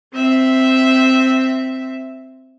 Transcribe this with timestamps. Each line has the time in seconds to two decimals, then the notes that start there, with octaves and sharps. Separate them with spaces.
0.14 C4 E5